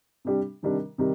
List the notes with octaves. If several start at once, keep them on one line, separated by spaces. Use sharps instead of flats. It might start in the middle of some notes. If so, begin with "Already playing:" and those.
C3 G3 D4 G4
C3 D#3 G3 D4
C3 D#3 G3